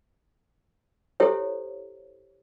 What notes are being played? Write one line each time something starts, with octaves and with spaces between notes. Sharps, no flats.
E4 G4 A4 C5 C#5